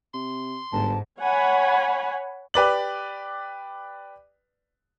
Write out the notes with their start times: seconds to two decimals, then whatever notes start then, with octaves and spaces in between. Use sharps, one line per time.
0.14 C3 C6
0.72 G1 G#2 A5
1.20 C#5 F#5 G#5 B5
2.54 G4 B4 D5 F#7